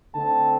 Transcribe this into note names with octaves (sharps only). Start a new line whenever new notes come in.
D3 A3 C4 A5